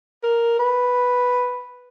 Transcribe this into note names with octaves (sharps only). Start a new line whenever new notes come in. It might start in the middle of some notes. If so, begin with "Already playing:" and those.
A#4
B4